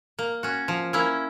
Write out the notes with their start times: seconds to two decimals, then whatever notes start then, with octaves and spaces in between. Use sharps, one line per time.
0.19 A#3
0.43 C#4 F#4
0.68 F3
0.93 A#3 C#4 E4